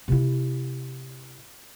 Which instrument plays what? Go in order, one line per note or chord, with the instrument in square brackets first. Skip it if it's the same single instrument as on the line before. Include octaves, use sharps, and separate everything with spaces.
[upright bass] C3 E4